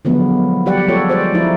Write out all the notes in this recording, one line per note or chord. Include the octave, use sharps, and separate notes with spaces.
D3 F3 F#3 G#3 B3
G3 G4 D5 F#5
F3 G#3 F4 A4 C#5
C5 D5
F3 G#3 D#4 E4